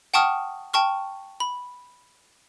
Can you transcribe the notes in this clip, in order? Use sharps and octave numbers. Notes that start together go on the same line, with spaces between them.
F#5 G5 A5 C#6 D#6 F6
G5 A5 C#6 F6
B5